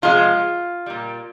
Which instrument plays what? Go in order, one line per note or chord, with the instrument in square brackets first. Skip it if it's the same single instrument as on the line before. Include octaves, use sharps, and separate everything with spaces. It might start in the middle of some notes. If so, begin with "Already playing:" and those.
[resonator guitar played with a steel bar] C3 F3 G#3 F4
A#2 G3